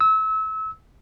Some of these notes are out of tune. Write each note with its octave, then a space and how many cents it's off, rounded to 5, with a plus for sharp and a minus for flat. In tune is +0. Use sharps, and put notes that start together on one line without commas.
E6 -30